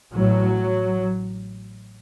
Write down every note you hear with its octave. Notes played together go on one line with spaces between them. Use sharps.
A1 A2 F#3